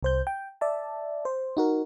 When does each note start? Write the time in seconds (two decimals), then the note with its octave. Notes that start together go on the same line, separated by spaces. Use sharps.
0.03 C2 C5 G6
0.27 G5
0.61 D5 E5 A5
1.25 C5
1.57 D#4 F#4 A#4